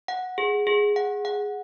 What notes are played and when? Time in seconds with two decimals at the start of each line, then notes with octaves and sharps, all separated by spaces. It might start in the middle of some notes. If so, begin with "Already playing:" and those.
0.08 F#5
0.38 G#4
0.67 G#4
0.96 F#5
1.25 F#5